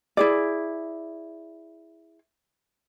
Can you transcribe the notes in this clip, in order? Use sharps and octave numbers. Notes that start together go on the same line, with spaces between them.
E4 G#4 D5